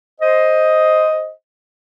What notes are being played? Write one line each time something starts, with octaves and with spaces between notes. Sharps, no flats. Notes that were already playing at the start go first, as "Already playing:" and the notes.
C5 D#5